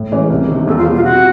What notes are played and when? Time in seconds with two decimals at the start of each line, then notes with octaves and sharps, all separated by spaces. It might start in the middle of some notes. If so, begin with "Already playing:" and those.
Already playing: A2
0.12 E3 G#3 C#4
0.30 C2
0.48 C3 D#3
0.67 E2 A4
0.76 F4
0.86 B2 G3
0.95 F4
1.03 C3 F#4